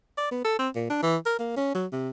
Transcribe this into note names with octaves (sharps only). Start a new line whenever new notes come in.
D5
B3
A4
C4
A#2
D4
E3
A#4
A#3
C#4
F#3
C3